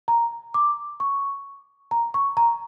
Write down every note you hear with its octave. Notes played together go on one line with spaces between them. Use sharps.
A#5
D6
C#6
A#5
C#6
A#5